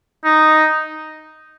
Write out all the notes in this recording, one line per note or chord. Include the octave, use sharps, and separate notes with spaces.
D#4